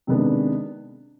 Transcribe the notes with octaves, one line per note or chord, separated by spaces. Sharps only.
C3 D#3 G#3 B3 D4